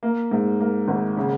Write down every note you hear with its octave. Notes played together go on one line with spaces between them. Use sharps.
A#3
G#2
A#3
G#1
C#3